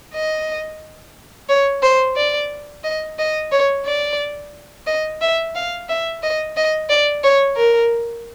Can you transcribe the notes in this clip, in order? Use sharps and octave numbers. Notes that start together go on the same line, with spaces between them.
D#5
C#5
C5
D5
D#5
D#5
C#5
D5
D#5
E5
F5
E5
D#5
D#5
D5
C#5
A#4